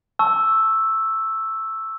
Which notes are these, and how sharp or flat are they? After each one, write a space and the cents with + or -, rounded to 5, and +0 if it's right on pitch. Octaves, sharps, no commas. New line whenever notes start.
A5 +0 C#6 +0 E6 +0